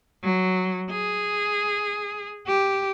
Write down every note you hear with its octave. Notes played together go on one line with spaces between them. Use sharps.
F#3
G#4
G4